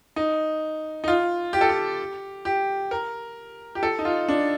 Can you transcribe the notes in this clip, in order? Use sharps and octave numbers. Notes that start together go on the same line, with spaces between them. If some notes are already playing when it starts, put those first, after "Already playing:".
D#4
D#4
F4
G4
A4
G4
G4
A#4
G4
A4
D#4
F4
D4